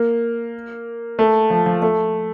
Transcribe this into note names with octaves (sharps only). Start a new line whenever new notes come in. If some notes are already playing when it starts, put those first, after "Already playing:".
Already playing: A#3
A3
F3
F3
A3